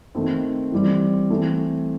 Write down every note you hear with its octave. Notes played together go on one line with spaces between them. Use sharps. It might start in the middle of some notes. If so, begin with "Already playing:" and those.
D#3 A3 C4
E3 G3 C4
E3 A3 C4